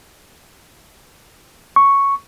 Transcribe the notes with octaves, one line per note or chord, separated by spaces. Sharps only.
C#6